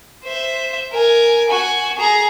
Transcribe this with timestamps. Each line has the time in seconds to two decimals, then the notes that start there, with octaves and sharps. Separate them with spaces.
0.24 C5 E5
0.93 A#4 G#5
1.49 F#4 G#5
1.98 G#4 A#5